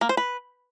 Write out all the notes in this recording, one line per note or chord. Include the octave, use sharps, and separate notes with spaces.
A#3
C5
B4